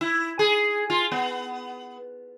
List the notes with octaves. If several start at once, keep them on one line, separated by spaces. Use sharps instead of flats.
E4
G#4
F4
B3